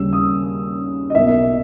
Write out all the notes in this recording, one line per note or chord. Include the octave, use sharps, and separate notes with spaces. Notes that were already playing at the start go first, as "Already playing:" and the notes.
Already playing: D#2 C#3 G3 C#4 E6
D#6
D#5
B1 B2 A#3 E5